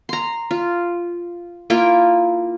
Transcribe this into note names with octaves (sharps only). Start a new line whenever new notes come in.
A#5 C6
F4
A#3 E4 F4 G5